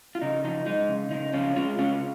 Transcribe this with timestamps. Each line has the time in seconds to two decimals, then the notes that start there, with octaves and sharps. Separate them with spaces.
0.15 F4
0.22 C#3 D#4
0.44 F3 D#4
0.66 G#3 D#4
0.89 C#3
1.11 C#3 D#4
1.33 F3 C#4 F4
1.56 G#3 C#4 F4
1.78 C#3 C#4 F4